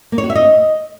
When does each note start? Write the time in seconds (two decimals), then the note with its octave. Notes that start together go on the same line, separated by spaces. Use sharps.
0.12 A#3
0.18 C#5
0.24 F#4
0.30 E5
0.36 D#5